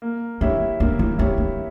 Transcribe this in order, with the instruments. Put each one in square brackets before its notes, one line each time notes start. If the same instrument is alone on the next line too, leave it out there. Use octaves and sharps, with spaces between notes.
[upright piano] A#3
[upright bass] D4 [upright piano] E4 G4 C#5 E5
[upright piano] A#3 [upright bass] D4
[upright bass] E4
[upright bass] D4 [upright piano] E4 G4 C#5 E5
[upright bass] D4